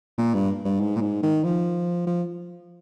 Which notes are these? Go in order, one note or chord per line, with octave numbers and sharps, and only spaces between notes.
A#2
G2
G2
G#2
A#2
G#2
D#3
F3
F3